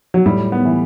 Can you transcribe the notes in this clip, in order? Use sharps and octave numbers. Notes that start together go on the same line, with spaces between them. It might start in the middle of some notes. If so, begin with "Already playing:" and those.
F#3
A2 G3
B3
E3